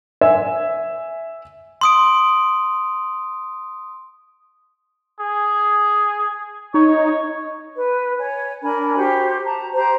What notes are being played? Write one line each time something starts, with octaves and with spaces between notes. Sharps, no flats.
E5 G#5
C6 D#6 D7
G#4
D#4 C#5
B4
C#5 G#5
D4 A#4 G#5 B5
F#4 G4 C5
A5 A#5
G4 C5 A#5